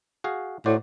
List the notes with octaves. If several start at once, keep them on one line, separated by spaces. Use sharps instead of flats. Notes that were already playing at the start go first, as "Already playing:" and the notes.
F#4 G#4 F5
A2 F#4 C5 D5